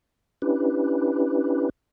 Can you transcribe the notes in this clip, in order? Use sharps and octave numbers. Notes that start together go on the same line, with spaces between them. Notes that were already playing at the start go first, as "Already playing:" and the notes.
C#4 D4 E4 G4 B4